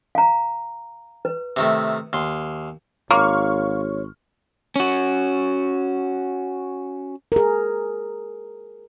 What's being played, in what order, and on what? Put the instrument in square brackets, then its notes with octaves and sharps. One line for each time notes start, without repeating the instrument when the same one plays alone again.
[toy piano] F5 A#5
B4
[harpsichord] C3 D#3 A3
D#2 C6
[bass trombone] G#1 [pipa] A#3 [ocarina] C#5 [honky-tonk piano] C6 C#6 F6
[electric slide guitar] C#4 F#4
[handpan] G#4 A#4